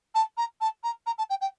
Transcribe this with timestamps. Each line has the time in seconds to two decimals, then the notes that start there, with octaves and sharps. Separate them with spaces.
0.15 A5
0.37 A#5
0.61 A5
0.84 A#5
1.06 A#5
1.18 A5
1.30 G5
1.41 G5